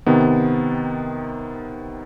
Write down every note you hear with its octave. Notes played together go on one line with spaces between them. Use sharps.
C3 D#3 B3